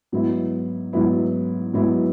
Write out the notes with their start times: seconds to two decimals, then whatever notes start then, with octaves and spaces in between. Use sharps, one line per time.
0.12 G#2 F#3 B3 E4
0.93 G#2 F#3 B3 E4
1.74 G#2 F#3 B3 E4